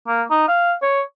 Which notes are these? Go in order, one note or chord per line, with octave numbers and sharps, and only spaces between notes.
A#3
D#4
F5
C#5